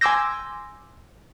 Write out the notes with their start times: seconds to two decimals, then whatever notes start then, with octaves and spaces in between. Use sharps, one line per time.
0.01 G#5 C6 D6 E6 G6 A#6